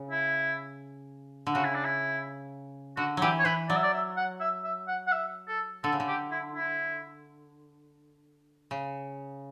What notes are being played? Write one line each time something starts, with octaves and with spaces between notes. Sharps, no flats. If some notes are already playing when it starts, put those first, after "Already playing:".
Already playing: C#3
E4
D3
C#3 F#4
E4
D4
E4
D3 F#4
E3 F#3 G4
C#5
E3 B4
F#3 D5
E5
D5
E5
F#5
E5
E5
F#5
F#5
E5
A4
D3 A4
C#3
D3
G4
E4
E4
C#3